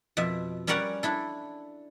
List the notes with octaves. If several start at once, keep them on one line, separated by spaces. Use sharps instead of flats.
F2 B2 E5
G3 C#4 A#4 C#5 D5 F#5
D4 E4 A4